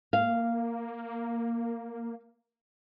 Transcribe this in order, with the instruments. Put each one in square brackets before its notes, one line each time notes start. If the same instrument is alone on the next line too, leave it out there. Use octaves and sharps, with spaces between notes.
[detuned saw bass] A#3 [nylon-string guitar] F5